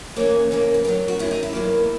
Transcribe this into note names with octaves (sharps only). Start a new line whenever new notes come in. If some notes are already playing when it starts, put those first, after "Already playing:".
C#3 E3 A#3 C#5
C#3 E3 A#3
B4
F#2 D#3 F#3 A#4
F#4
F#2 D#3 F#3 E4
D#4
E4
E2 D#3 F#3 A#3